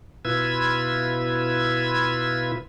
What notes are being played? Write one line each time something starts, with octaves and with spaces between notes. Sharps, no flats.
B2 E4 F4 B4 E6 G#6